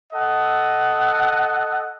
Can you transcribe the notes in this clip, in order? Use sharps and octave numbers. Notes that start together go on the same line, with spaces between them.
A4 D#5 F#5